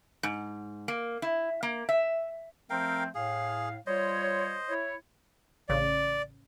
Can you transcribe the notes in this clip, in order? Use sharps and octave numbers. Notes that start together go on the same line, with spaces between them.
G#2
A#3
E4
A#3
E5
F3 A3 C4 A#4 F5 G5
A2 G#4 F5
G3 F4 C5 C#5 D#5
E4 C#5
A1 C#3 D5